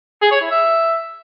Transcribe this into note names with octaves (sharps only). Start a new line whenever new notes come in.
G#4
C#5
E4
E5